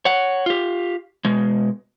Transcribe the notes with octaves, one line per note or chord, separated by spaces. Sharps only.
C#5 F#5
F4 G4
B2 G#3